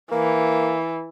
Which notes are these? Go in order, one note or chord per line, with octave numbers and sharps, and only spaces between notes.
E3 A#3